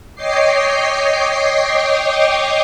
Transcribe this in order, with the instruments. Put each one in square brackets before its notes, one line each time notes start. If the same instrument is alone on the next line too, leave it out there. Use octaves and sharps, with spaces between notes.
[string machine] C#5 D#5 G5 D6 C7